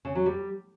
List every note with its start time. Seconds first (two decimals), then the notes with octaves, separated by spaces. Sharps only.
0.05 C#3
0.15 F#3
0.26 G3